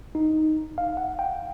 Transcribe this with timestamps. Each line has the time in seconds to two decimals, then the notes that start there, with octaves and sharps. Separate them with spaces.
0.15 D#4
0.78 F5
0.97 F#5
1.19 G5